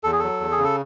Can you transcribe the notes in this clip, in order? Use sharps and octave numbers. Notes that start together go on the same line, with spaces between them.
E2 A4
G#4
F#3 A4
E2
G#4
C#3
A4